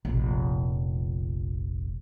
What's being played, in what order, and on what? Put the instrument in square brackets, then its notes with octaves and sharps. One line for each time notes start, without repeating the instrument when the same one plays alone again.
[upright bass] F1 A#1